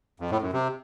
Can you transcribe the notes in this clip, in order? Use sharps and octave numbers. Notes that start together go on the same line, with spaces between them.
F2
A2
F#2
C3